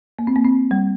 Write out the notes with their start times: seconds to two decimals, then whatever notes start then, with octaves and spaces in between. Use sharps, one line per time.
0.19 A#3
0.27 C4
0.36 A#3
0.44 C4
0.71 G3